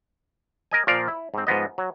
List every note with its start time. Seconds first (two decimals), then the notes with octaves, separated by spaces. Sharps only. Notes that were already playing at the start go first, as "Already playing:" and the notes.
0.71 A#4 D#5 G#5
0.87 A#2 F3 A#4 D5 F5
1.08 E4
1.34 G#2 C4
1.47 G#2 F3 B3 D#5
1.78 F#3